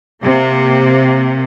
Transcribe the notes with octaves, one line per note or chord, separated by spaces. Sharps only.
C3 A#3